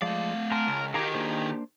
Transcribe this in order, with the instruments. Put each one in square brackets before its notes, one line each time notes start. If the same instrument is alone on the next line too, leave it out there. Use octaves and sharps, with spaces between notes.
[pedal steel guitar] F3 G#3 D5 [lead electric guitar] A3 F5
[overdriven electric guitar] A#4 [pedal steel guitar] G#5 A5 C6
[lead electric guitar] C#2
[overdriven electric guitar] D#3 [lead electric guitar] G4 G#4 [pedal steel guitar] F5 A#5 D6
[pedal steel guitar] A#3 D4 C5